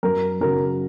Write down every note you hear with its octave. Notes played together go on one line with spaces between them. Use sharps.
F#2 A#4
C#3 F#3 A#4